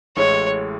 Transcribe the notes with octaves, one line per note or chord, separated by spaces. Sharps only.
A1 A2 G#3 C#5